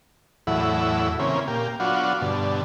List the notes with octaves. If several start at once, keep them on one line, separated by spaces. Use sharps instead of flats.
E2 A2 F#3 E4
C#3 E3 A#3 C4 C#4
A#2 A#3 G4
F#3 B3 D4 F4 F#4
G2 B2 D3